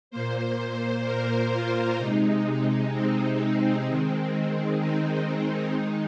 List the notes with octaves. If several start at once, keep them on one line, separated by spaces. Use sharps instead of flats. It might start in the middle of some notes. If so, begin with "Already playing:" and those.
A#2 A#3 C5
C5
C5
A#4
F4
C3 G#3 D#4
C4
D#3 G#3
D#4
D#3 G#3